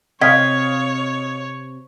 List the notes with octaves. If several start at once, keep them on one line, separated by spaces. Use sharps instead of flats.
C3 C#5 D#5 F5 G5 F6 G#6 B6